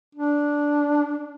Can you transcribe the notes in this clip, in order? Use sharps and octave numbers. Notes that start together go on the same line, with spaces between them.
D4